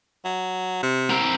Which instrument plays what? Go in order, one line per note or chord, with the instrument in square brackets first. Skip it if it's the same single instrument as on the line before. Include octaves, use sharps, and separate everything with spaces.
[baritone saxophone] F#3
C3
[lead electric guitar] C4 A#4